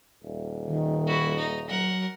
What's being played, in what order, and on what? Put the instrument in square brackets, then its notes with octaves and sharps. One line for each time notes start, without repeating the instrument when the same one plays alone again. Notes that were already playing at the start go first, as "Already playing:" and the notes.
[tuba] D#1
[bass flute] D#3
[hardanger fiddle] E4 F#4
D#4
[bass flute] F#3 [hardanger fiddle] A#4 F#5